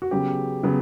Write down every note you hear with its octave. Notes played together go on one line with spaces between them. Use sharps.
F#4
C#3 F#3 B3 G4
C#3 F#3 B3